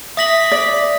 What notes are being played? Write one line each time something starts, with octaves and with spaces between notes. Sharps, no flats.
E5 D#6 A#6 B6 F#7
D5